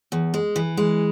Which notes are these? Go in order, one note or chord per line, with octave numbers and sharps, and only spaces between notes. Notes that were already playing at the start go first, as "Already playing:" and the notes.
E2
G#3
E3
G#3